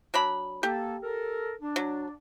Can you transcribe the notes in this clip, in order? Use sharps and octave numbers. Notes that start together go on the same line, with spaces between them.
F#3 D4 B5
A#3 G4 A4
A4 A#4
D4
F#3